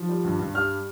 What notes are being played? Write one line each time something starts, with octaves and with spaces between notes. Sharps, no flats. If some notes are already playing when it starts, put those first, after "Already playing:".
Already playing: F3
G3
G2
G2
G3 F6